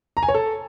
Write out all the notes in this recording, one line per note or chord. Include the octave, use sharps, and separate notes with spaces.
A#5
G#5
C#5
A4